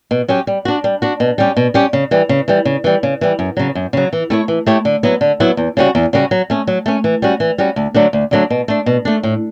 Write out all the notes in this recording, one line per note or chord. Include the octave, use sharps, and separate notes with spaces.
B2
F#3 C#4 G4
G3
D4 F#4
G3
D4 F#4
B2
G3 C#4 G4
B2
G3 C#4 G4
C#3
E3 G3
C#3
E3 G3
C#3
E3 G3
C#3
E3 G3
F#2
C#3 F#3
F#2
C#3 F#3
E3
A3 E4 G4 C#5
E3
A3 E4 G4 C#5
D3
F#3 B3 E4
D3
F#3 B3 E4
E2
C#3 G3 C#4 F#4
E2
C#3 G3 C#4 F#4
F#3
A3 C#4
F#3
A3 C#4
E3
G3 C#4 F#4
E3
G3 C#4 F#4
D2
D3 F#3 A3 D4
D2
D3 F#3 A3 D4
B2
A3 D4
B2
A3 D4
A2